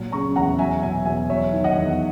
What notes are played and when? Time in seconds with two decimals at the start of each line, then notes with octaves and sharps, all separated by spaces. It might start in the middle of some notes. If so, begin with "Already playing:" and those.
Already playing: A#2 F#3
0.12 C#3 A#5 C#6
0.36 E2 F#5 A#5
0.59 F#3 E5 G#5
0.83 B2 E5 G#5
1.05 E2 E5 G#5
1.29 F#3 C#5 E5
1.53 D#3
1.64 D#5 F#5
1.76 E2